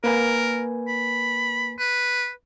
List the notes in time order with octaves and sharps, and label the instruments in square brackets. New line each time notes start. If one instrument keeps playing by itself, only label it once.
[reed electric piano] A#3 B4 G#5 [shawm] A#4
[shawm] B5
B4